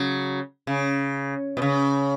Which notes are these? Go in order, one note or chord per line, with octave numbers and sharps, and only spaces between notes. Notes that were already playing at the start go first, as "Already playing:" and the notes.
Already playing: C#3 F#3
C#3
B2
C#3